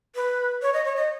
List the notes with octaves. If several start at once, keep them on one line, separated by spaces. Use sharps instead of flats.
B4
C#5
D#5
C#5
D#5